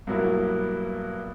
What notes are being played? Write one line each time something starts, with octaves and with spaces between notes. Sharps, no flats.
G2 B2 F#3 A#3 E4